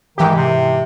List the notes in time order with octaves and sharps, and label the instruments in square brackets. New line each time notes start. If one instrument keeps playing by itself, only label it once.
[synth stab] G#2 E3 G4 [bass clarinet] D#3
[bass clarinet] C3